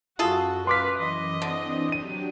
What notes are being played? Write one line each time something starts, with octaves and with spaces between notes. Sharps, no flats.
F#2 F4 F#4 G#4 A4
B4 F5 C6 D6 B6
F#2 E3 D#5
D3 E3 C4 D4
F#3 D4 G4 D#7